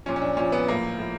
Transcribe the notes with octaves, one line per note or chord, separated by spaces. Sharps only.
A#2 F3 C#4
C#4
D4
A#2 F3 C#4
B3
A2 F3 A#3
A2 F3